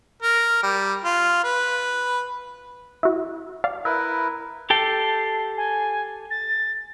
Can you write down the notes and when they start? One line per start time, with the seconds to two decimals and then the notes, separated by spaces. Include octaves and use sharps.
0.22 A#4
0.63 G3
1.05 F4
1.44 B4
3.03 E4 F#4
3.64 D5 F5
3.85 E4 A#4 B4 E5
4.70 G4 A4 G5 C7
5.57 G#5
6.31 A6